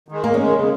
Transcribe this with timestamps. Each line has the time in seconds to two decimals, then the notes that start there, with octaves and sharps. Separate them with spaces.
0.08 D#3 G#3
0.24 E2 A#3
0.34 C#4
0.39 D#3 G#3
0.54 C#3